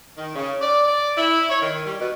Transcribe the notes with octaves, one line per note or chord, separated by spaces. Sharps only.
D#3
C#3
D5
D5
E4
C#5
D#3
G3
B2